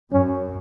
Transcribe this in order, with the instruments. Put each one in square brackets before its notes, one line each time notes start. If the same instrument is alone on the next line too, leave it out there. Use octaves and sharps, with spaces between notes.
[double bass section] F#2 [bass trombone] C#4